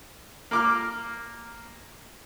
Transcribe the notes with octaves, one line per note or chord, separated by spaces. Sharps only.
A#3 D6 F6